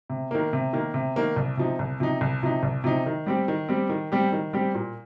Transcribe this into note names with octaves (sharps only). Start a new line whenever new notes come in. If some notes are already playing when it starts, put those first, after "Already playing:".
C3
D#3 A#3
C3
D#3 A#3
C3
D#3 A#3
C2
C3 F3 D#4
C2
C3 F3 D#4
C2
C3 F3 D#4
C2
C3 F3 D#4
D#3
G3 C4 G4
D#3
G3 C4 G4
D#3
G3 C4 G4
D#3
G3 C4 G4
A#2